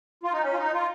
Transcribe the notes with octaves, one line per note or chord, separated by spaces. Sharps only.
F4
D#4
C#4
F4
D#4
F4